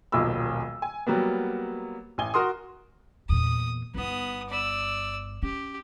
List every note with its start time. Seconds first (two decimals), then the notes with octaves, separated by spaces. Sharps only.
0.12 D#1 B1 F3 A#3 B5 E6
0.82 G#5
1.07 F#3 G3 A#3 B3
2.18 A1 G#5 G7
2.34 F#4 A#4 C6 D#6
3.29 E2 A#2 D#6
3.94 G1 B3 D#4 D#6
4.49 D5 E6
5.43 C#4 G4